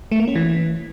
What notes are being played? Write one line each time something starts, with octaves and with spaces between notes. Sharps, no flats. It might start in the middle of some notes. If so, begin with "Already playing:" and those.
A3
A#3
C#4
E3